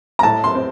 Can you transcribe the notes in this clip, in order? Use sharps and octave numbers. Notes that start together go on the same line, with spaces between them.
A#5
A2 A5
C6
C4